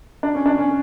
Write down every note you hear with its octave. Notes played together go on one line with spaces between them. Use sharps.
D4
C#4
D4
C#4